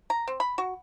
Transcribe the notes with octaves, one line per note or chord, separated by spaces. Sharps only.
A#5
C4
B5
F#4